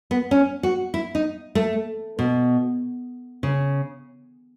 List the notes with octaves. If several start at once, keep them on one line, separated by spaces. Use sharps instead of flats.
B3
C#4
F#4
E4
D#4
A3
B2
C#3